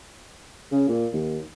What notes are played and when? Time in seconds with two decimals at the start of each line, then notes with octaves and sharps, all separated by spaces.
0.72 C#3
0.88 A#2
1.13 D#2